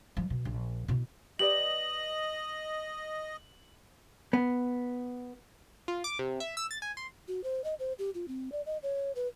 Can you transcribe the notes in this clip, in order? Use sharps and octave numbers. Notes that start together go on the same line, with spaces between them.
F3 G3
B2
A#1
B2 E4
G4 B4 D5 D#5 F#7
B3
F4
D6
C3
E5
E6
A6
G#5
C6
F#4
C5
D#5
C5
G4
F4
C4
D5
D#5
C#5
B4